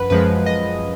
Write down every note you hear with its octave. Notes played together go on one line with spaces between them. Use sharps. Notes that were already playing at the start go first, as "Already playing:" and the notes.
Already playing: F#2 F3 B4 F#5
F#2 F3 G#3 B4
D#5